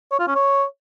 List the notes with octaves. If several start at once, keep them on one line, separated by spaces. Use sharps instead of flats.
C#5
F4
C#4
C#5